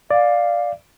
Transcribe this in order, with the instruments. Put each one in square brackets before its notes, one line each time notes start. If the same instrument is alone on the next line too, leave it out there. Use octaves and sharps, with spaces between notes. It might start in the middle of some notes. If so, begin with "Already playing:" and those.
[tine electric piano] D5 [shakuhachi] F5